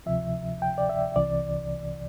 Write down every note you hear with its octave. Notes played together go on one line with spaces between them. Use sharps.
D2 C3 F3 E5
G5
D5
E5
C2 C3 E3 D5